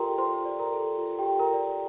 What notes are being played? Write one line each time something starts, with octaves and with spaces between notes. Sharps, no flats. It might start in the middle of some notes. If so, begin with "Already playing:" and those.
Already playing: F4 G4 A4 A#4 D5 G5 A#5 C6
F4 C5 C6
D5
A#4 A#5
A4
F4
G4 G5
F4
A#4 A#5
D5